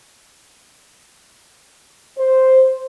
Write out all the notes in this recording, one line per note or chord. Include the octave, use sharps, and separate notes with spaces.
C5